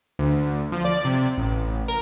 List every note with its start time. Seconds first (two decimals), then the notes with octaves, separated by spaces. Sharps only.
0.19 D2
0.72 F3
0.85 D5
1.05 C3
1.38 A1
1.88 A#4